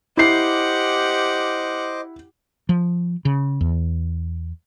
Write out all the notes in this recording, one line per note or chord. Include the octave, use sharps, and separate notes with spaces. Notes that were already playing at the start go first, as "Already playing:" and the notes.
E4 G4 C5 D#5 F#5 D6 C7
F3
C#3
E2